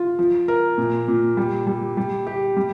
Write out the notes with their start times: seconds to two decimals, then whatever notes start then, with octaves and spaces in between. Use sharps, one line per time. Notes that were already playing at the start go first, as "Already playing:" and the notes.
Already playing: F4
0.19 F3
0.48 A#4
0.78 A#2
1.08 A#2
1.37 G3
1.67 G3
1.97 G3
2.27 G4
2.57 G3